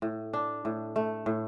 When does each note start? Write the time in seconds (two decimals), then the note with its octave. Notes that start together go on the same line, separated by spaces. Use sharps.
0.02 A2
0.33 D4
0.65 A2
0.96 A3
1.26 A2